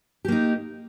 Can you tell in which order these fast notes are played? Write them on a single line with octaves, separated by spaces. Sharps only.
G4 A#3 D#4